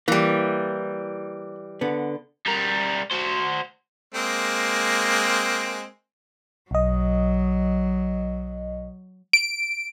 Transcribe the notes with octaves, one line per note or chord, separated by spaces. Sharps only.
E3 G3 A#3
D3 B3
G3 A#4
F#4 C5
G#3 A#3 C4
B1 F#3 D#5
D7